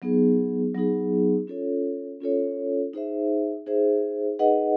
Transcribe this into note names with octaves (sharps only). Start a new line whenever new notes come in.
F#3 B3 D#4 G#4
F#3 B3 D#4 G#4
C#4 F4 A4 C#5
C#4 F4 A4 C#5
D#4 G#4 C5 E5
D#4 G#4 C5 E5
D#4 G#4 B4 D#5 F#5